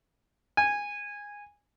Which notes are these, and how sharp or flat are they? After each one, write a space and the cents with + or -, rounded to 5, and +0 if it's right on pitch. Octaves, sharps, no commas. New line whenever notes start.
G#5 -15